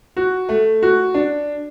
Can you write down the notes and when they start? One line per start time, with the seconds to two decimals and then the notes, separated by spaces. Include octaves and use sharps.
0.17 F#4
0.49 A3
0.83 F#4
1.14 D4